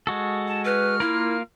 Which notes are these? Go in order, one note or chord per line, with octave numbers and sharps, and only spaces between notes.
G#3 F#4 A4
A5
B4 F6
A#3 E4 F4 A#4